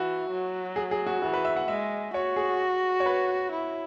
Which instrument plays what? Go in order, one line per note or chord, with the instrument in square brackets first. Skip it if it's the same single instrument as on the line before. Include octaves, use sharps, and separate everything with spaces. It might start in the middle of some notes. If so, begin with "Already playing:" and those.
Already playing: [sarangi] E3 [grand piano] F#4
[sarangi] F#3
[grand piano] G#4
G#4
F#4
[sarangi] E3 [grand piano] F#4
[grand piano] B4
E5
F#5
[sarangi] G#3 [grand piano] E5
[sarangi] F#4 [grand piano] C#5
[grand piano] G#4
C#5
B4
[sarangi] E4